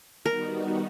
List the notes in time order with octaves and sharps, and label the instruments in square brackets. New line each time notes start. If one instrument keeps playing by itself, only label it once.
[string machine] D#3 G3 B3 D#4 F#4 [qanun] A#4